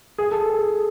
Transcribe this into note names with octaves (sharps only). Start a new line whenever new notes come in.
G#4
A4
A4
G#4